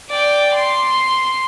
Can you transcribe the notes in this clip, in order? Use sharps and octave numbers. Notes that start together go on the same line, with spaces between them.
D5 G5
C6